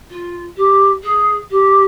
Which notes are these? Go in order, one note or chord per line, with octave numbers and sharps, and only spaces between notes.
F4
G4
G#4
G4